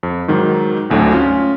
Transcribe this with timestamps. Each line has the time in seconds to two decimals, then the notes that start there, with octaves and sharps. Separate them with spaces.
0.03 F2
0.28 G#2 D#3 F#3
0.90 G#1 D2 A2 D3 F#3
1.13 C#4 F4